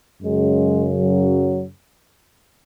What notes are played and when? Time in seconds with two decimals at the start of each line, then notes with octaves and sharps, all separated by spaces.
0.22 F#2 C#3 F#3 G#3
0.96 F#3